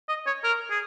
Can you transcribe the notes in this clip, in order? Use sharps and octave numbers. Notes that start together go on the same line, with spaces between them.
D#5
C#5
A#4
G#4